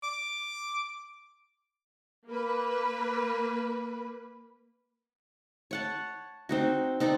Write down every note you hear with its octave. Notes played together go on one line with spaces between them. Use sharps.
D6
A#3 B4
C#5 F#5 A5
C4 D#4 F#4
C4 D#4 A4 D5